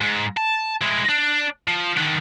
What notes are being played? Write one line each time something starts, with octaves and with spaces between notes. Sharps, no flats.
G#2
A5
G#3 E4
D4
F3
D3 D#3